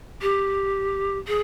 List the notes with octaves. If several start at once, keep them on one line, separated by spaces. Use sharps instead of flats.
G4
G#4